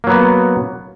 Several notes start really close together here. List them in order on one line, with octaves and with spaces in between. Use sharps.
A#3 F#3 B3